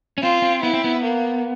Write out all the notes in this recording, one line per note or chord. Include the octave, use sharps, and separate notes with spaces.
C#4
C4 F4
C4
B3 E4
C4
B3
A#3